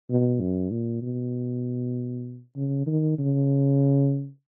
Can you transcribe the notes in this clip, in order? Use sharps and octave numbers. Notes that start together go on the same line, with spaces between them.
B2
F#2
A#2
B2
C#3
D#3
C#3